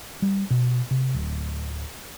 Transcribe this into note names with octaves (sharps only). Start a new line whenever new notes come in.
G3
B2
C3
D1